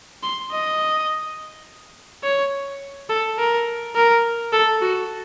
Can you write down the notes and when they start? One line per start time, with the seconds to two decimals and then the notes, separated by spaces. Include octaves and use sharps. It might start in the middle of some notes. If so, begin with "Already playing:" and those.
0.23 C6
0.51 D#5
2.23 C#5
3.09 A4
3.39 A#4
3.96 A#4
4.53 A4
4.82 F#4